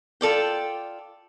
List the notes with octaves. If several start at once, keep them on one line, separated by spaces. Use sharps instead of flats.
F4 A4 D5 G5